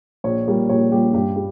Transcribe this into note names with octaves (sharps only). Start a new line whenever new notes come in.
A#1 C#5
A#2 G3 A#3
A#1 C#5
A#2 G3 A#3 G4
G2 G4
G3